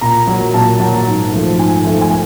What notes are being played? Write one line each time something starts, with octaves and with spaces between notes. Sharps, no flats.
A#2 A#5
F#3 A#3
A#2 A5
F#3 A#3
G#2
F3 A3
G#2 G#5
F3 A3
G#5